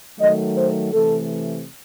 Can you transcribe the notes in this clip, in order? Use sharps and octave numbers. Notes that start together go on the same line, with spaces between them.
D#3 F#3 A3 D#5
C5
C3 E3 A3 A4